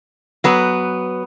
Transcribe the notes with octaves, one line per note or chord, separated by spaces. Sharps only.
F#3 B3 B4